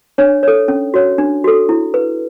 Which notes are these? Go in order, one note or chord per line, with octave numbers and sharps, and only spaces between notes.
D4 C#5
A4 C#5
C#4
F#4 C#5
D4
F#4 A4
E4
B4